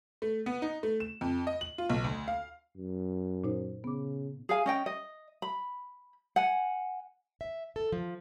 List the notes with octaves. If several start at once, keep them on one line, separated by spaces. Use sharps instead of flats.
A3
B3
D#4
A3
E7
F2
D#5
F#7
F4
B1
D2
F5
F#2
A#2 D#4 C5
C#3 B3 D6
G#4 F5 G#5
C#4 D#5 G5
D#5
B5
F#5 G#5
E5
A4
F3